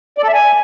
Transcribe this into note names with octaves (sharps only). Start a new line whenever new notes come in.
D5
A4
E5
G#5